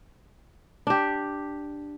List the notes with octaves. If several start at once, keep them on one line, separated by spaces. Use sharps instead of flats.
D4 G4